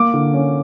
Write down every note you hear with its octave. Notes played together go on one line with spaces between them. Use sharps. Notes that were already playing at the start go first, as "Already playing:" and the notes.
Already playing: A#3 D6
D3
C#4